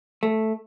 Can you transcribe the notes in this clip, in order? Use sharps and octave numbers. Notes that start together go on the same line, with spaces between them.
A3